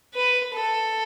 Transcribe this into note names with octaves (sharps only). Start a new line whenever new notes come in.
B4
A4